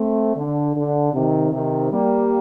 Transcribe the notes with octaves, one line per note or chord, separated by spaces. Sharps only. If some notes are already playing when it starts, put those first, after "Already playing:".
Already playing: A3 C4
D3
D3
C3 D#3
C3 D#3
G3 A#3